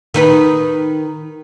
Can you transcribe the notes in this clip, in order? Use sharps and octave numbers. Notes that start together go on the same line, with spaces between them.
D#3 D#4 B4